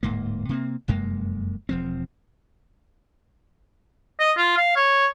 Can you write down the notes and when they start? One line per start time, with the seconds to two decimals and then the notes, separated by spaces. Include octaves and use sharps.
0.03 D1 G#2 A#3
0.49 C3 A#3 C4
0.88 F1 F#2 G#3 A#3
1.69 E1 F3 C4
4.20 D#5
4.37 F4
4.57 F5
4.76 C#5